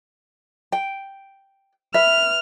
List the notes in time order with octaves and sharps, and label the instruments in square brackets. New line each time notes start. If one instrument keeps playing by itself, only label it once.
[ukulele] G5
[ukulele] B4 E5 [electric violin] F6